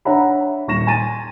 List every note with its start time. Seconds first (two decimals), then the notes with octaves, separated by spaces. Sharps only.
0.05 D4 C#5 E5 F#5 A#5 B5
0.68 D#1 C#6 A#6 E7
0.87 G#5 C6 A6 D#7